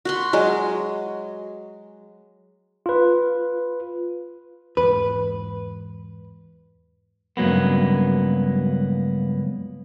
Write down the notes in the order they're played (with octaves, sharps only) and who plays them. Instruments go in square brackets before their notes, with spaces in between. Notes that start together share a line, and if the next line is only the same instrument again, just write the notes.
[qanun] F#4 B5 C6
F#3 G#3
[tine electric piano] F4 B4
[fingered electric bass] E2 G#2 [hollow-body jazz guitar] B4
[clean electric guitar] C#2 G2 F#3 A#3 B3